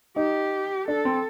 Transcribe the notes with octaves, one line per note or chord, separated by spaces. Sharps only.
D#4 G4
D4 A4
C4